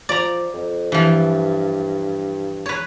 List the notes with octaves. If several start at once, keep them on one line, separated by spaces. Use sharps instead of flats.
F3 D5 A#5
F2
G2 E3 F3
B4 C#5